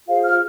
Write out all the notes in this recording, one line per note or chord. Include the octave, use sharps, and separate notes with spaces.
F4 G#4 C5 F5
F6